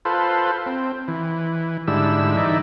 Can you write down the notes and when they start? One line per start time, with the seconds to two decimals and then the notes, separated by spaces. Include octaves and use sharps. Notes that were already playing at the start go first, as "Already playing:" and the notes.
0.05 F4 A4 B4 C5
0.66 C4
1.08 E3
1.87 G#2 D3 G3 E4 E6
2.37 E3 D#4 D5 E5